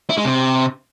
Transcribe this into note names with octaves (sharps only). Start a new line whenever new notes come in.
E4
G#3
C3